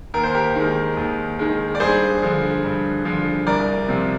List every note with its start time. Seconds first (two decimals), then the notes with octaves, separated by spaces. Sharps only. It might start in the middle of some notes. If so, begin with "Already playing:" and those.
0.14 D#2 A#4
0.23 C5
0.35 G4 A#4
0.56 D#3 G#3
0.97 D#2
1.39 D#3 G#3
1.75 D5
1.80 G2 G#4 C5
2.22 D3 F3
2.64 G2
3.05 D3 F3
3.47 C2 A#4 D5
3.89 C3 F3